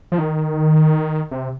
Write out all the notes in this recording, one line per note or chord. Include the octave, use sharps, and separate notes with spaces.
F3
D#3
C3